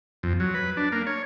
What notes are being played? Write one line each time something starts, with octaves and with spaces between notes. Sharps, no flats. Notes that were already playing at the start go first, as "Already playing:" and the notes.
F2
F#3
B4
D4
A#3
C#5